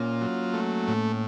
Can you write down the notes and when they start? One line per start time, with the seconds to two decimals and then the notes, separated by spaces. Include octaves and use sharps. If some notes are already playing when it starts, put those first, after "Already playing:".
Already playing: A#2 A#3 C#4 F4
0.21 F#3
0.54 A3
0.88 A2